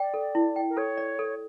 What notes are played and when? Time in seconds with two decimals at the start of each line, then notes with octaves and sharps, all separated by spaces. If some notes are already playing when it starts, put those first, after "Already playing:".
Already playing: D5 G5
0.14 A4
0.35 E4
0.56 G5
0.69 A#4
0.77 A4 C#5
0.97 D5
1.19 A4